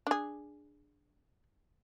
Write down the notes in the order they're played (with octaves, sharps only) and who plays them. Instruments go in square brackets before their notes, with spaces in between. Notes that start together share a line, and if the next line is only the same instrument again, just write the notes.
[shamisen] D4 G#4